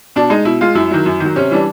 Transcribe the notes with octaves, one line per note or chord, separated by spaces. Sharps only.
B2 D4
G#3 D#4
B2 E4
G#3 F4
F#2 E4
D#3 F#3
F#2
D#3 F#3
C3 C#4
E3 G3 D4